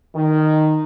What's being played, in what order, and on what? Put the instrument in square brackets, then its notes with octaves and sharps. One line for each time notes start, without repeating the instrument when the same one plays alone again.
[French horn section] D#3